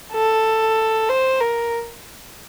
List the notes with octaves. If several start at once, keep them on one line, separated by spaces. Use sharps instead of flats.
A4
C5
A#4